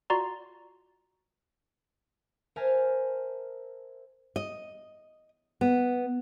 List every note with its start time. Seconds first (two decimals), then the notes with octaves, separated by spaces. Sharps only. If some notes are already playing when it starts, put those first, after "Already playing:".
0.10 F4 F#4 D5 A#5 C6
2.56 A#4 C5 E5 G#5 A5 F6
4.36 D#5
5.61 B3